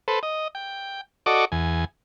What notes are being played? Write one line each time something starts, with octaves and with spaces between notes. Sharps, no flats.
A4 B4 C5
D#5
G5
F#4 A4 D5 D#5 C#6 D6
E2 G#5